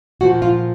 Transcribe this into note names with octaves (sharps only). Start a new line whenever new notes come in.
A#2 F3 F#4
F4